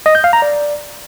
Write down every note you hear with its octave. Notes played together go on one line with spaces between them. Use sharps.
D#5
G6
F5
A#5
D5